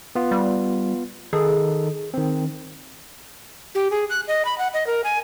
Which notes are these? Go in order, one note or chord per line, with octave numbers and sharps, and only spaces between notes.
B3 F4
G3
D#3 D#4 G#4 A4
D#3 C4
G4
G#4
F#6
D#5
B5
F#5
D#5
A#4
G#5